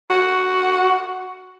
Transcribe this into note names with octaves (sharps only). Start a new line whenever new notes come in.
F#4